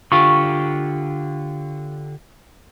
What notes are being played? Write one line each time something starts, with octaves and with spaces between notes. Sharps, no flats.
D3 F4 G4 C#6